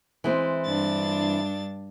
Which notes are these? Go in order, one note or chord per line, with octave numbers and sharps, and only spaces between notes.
E3 G#3 C4
G2 D4 A6